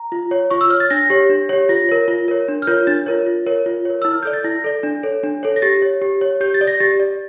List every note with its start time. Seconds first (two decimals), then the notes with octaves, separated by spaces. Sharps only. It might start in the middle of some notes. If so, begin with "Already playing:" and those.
Already playing: A#5
0.12 F4
0.31 C#5
0.50 F4 C#6
0.61 E6
0.70 C#5 F6
0.80 A6
0.90 D4 A#6
1.10 G4 C#5
1.30 D4
1.49 G4 C#5
1.69 F4 A#6
1.89 A#4 C#5
2.08 F4
2.28 A#4 C#5
2.48 D4
2.62 F6
2.67 F4 A#4 C#5 G6
2.87 D4 A6
3.06 F4 A#4 C#5
3.26 F4
3.46 A#4 C#5
3.66 F4
3.85 A#4 C#5
4.02 E4 E6
4.12 F6
4.23 A4 D5 G6
4.33 A6
4.44 E4 A#6
4.64 A4 D5
4.83 D4
5.03 A4 C#5
5.23 D4
5.43 A4 C#5
5.56 A#6
5.62 G4 A6
5.82 C#5
6.02 G4
6.21 C#5
6.41 G4 G6
6.54 A6
6.61 D5
6.67 A#6
6.80 G4 A6
7.00 D5